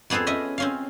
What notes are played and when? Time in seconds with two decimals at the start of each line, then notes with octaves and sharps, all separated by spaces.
0.10 F2 B3 G#4 A4 C5
0.27 C#4 D#5 E5
0.58 C4 C#4 F5